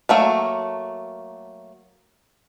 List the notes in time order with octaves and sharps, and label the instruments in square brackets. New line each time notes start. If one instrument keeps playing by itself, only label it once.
[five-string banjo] F#3 A3 A#3